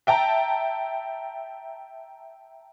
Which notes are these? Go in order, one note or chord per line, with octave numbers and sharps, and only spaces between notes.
E5 G5 A5 A#5